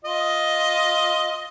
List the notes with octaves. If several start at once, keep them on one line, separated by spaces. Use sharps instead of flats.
F4 D#5